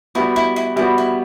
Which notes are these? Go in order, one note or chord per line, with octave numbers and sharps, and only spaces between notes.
G3 B3 E4 F#4
E4
E4
G3 B3 E4 F#4
E4